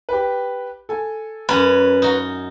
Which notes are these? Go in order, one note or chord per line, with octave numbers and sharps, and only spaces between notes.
G4 B4
A4 G#5
F#2 C#4 B4 A#5
D#4 F#4